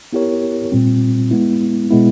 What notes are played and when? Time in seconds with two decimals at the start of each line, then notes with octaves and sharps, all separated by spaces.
0.13 B3 E4 G4 A#4 C#5
0.72 A#2 G3 C4 F4
1.31 G#3 B3 E4
1.90 B2 G#3 B3 E4